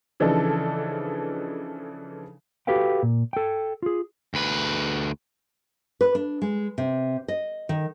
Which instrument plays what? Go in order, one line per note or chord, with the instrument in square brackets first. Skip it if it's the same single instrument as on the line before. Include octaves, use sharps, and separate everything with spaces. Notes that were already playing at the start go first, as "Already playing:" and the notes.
[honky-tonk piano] C#3 E3 F3 D4 D#4 A4
[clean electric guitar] F#4 G4 A4 B4 F5 G5
A#2
A4 G5
F4 G#4
[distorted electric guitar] D2 B4
[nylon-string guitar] B4
D4
G#3
C3
D#5
D#3